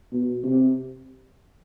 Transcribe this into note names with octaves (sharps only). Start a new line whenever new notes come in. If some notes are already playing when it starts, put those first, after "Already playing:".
B2
C3